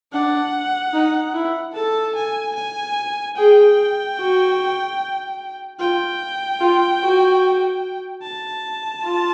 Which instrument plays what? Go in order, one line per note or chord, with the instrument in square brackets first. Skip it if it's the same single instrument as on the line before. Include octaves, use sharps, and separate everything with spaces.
[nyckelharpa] D4 [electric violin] F#5
[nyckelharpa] D#4
E4
[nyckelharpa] A4 [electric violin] A5
[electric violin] G#5
G#5
[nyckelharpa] G#4 [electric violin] G5
[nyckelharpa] F#4
[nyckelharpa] F4 [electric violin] G5
[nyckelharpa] F4
F#4
[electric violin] A5
[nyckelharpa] F4